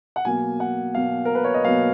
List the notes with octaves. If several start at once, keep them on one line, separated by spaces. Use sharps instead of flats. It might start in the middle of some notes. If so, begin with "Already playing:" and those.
F#5
B2 F#3 A#3 G#5
F#5
B2 F#3 A#3 F5
A#4
B4
C#5
D#5
B2 F#3 A#3 F5